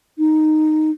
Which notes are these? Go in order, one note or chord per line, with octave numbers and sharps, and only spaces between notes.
D#4